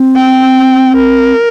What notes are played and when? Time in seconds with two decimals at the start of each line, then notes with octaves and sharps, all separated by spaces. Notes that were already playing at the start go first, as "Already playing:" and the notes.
Already playing: C4
0.16 G5
0.97 A#4